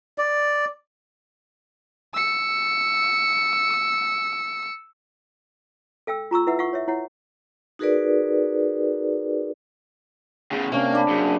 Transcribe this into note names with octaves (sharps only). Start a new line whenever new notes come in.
D5
E6 C#7
A4 F5 G5 E6
F4 A#5 C#6 E6
E4 B4 E5 F#5
F5 F#5 C#6
C#5 E5
E4 C#5 F#5
D#4 F#4 G#4 A#4 B4 D5
E2 C#3
C3 A#3 C#4 D4
D4 D5 B5
F#2 C#3